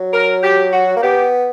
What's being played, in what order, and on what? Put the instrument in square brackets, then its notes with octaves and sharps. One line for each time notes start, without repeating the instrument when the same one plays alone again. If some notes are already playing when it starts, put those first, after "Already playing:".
Already playing: [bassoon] F#3
[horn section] A#4
G4
F#4
[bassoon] A#3
[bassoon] B3 [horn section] G4